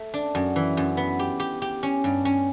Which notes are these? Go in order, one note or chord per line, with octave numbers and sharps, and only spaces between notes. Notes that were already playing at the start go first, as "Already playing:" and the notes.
Already playing: A3
D4
F#2
E3
F#2
B3
G4
G4
G4
C#4
G2
C#4